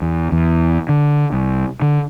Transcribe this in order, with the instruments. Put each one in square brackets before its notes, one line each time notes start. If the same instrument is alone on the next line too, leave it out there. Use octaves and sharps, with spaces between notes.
[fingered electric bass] E2
E2
D3
C2
D3